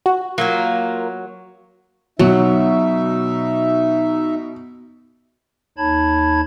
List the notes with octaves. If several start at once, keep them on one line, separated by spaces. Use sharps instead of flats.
F#4
F#3 A#3 F4 A#4
B2 F#3 D#4 E5
D#2 D#4 C#5 A5 B5 G#6